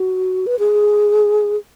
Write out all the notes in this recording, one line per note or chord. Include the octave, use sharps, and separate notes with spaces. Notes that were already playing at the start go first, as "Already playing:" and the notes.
Already playing: F#4
B4
G#4